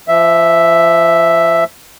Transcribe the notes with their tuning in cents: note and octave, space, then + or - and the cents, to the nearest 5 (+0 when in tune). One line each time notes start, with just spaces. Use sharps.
F3 -30 E5 +0